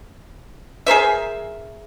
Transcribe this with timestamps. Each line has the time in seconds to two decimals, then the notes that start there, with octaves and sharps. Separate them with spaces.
0.86 G#4 A#4 C5 E5